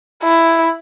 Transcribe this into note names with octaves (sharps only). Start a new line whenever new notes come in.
E4